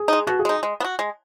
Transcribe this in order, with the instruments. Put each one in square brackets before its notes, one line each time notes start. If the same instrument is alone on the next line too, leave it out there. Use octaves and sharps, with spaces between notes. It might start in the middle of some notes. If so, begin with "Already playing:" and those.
Already playing: [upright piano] G#4
[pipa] G#3 D#4
[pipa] B2 [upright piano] F#4
[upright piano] G#4
[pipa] G#3 D#4
G#3
B3
F#4
G#3